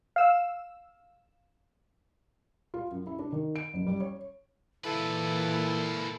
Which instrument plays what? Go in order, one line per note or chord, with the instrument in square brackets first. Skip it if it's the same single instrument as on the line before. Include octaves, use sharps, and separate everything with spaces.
[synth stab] F5 E6
[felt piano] F4
F#2
E4
D4
D#3
D7
F#1
G3
C#5
[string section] A#2 E3 [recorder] E4 [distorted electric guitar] F4 B4 [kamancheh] A4